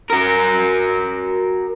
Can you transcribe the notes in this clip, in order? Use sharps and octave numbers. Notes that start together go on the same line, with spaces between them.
F#4 A#4